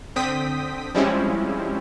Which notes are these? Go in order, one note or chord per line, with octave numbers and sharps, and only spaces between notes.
D3 C4 G5 D#6 B6
F3 G3 G#3 C4 C#4 E4